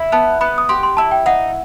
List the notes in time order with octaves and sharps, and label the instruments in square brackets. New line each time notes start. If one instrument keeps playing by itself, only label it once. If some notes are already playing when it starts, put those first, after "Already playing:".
Already playing: [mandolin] E4
[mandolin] B3 [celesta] A5
[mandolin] B3 [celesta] B5
[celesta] D#6
[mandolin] G4 [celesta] C6
[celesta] C6
[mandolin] E4 [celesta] A5
[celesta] G5
[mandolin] D#4 [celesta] F#5